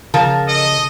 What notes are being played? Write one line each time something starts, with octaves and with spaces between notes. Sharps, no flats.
C#3 F3 A#4 A5
A4 D#5